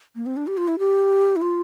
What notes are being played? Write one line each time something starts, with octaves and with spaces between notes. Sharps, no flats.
A#3
C4
D4
G4
F4
E4
G4
E4
F4